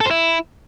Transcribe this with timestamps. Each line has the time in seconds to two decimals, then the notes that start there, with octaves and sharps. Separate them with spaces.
0.01 A4
0.06 C5
0.11 E4